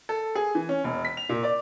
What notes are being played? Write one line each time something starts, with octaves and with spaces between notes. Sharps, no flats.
A4
G#4
E3
C#4
E1
B6
F7
A#2
D5